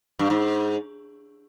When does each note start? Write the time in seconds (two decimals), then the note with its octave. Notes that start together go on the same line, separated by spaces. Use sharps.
0.19 G2
0.30 G#2